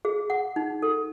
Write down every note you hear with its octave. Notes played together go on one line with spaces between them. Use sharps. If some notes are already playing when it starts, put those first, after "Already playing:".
G#4
F#5
D#4
A4